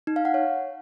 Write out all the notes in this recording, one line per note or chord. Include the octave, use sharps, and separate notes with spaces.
D#4
F5
F#5
C#5